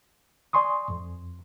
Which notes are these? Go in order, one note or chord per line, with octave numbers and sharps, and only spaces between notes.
D5 G#5 C6 C#6 D#6
F2